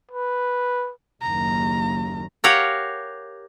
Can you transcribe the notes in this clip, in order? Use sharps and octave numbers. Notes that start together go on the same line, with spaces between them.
B4
F#1 D#2 A#5
G4 A#4 C#5 F5 F#5